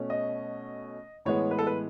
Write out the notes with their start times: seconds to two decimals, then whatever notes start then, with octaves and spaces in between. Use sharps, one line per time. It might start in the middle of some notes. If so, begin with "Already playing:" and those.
Already playing: B2 A3 C#4
0.10 D#5
1.25 A2 E3 G#3 B3 C#5
1.51 B4
1.59 A4
1.67 B4